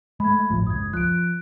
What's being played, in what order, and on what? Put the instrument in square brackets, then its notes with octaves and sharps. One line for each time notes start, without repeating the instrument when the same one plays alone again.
[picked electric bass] G#3 A3 [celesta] B5 G#6
[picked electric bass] D1 A1 F3
[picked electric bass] F#1 C#2 [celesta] D#6 G#6
[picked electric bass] F3 [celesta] F#6 D7